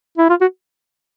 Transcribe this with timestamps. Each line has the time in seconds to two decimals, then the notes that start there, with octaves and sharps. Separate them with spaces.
0.17 E4
0.29 F4
0.41 F#4